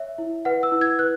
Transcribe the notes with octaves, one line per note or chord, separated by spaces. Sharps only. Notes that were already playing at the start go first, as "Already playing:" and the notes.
Already playing: C#5 E5
E4
B4 F#5
E6
E4
G#6
B4 F#6